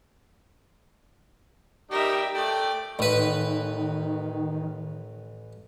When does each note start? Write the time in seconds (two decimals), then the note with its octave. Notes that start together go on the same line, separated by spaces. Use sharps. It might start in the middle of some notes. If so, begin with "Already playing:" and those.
1.91 G3 D#4 G4 A#4 E5
2.35 A3 D5 G5
2.99 A1 D#3 B4